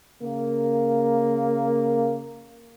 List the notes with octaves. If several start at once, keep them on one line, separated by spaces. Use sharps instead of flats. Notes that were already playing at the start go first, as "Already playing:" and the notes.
C#3 A#3